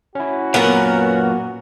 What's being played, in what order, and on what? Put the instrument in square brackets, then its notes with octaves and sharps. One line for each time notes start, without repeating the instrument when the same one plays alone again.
[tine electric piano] C#4 E4 [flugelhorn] F#4
[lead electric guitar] F#2 A#2 [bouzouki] B3 A#4 [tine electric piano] C#4